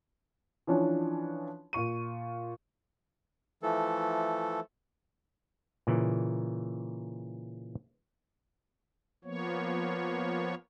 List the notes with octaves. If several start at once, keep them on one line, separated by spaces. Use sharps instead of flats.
E3 F3 C#4 D4
A#2 F4 C#6 D#7
E3 F3 A3 A4
A#2 C#3 E3
F3 A#3 B3 C#5